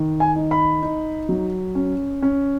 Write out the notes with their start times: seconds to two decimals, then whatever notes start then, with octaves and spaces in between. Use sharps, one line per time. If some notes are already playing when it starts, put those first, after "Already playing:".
Already playing: D#3
0.20 G#5
0.36 D#4
0.51 B5
0.82 D#4
1.29 F#3
1.75 C#4
2.22 C#4